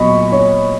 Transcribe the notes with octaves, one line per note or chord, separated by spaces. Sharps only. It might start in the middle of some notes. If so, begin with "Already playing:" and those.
Already playing: A#2 F#3 B3 D#5 B5 C#6
C#5